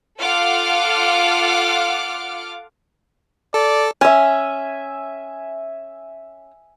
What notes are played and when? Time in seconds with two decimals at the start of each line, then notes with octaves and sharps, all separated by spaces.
0.19 F4 A4 F#5 D6 F6
3.54 A4 D5
4.01 C#4 E5 G#5